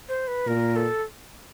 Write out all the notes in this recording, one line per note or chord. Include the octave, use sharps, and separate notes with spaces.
C5
B4
A#2 A#4
A4